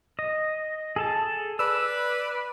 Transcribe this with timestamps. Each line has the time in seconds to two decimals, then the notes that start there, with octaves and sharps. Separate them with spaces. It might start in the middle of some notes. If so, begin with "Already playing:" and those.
0.19 D#5
0.96 G#4 A4 A5
1.59 B4 D5 E6